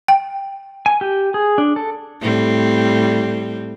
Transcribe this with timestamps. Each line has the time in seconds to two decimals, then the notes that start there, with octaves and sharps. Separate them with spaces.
0.08 G5
0.86 G#5
1.01 G4
1.34 G#4
1.58 D4
1.76 A4
2.21 A2 G3 C4